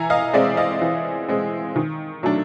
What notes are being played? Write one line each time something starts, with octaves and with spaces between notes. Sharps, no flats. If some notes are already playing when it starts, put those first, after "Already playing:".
Already playing: E3 G#5 A#5
D#5 F5
G#3 C4 D5 E5
D#5 F5
E3
G#3 C4
D#3
F#3 A3 D4